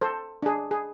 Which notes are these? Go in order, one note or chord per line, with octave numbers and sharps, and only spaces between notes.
A4 C5
D4 G#4
G#4